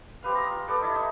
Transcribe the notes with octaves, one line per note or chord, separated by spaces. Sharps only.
C4 G4 B4 F5
A#5 D#6
F4
G4 A4 B4 D5
D#4 E4
D#4